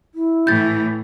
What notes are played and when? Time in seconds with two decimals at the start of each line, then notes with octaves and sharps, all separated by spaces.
0.15 E4
0.47 A2 E3 G6 A6